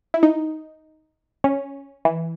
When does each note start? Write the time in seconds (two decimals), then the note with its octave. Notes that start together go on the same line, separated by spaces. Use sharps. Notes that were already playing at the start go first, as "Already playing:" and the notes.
0.14 E4
0.23 D#4
1.44 C#4
2.05 E3